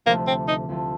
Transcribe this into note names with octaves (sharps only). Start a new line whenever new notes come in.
D2 C3 F3 A3 A#3
C4
D#4
D2 C3 F3 A3